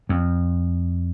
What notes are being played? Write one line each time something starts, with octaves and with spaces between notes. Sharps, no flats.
F2